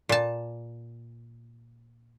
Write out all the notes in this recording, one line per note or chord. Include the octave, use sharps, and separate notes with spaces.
A#2 A5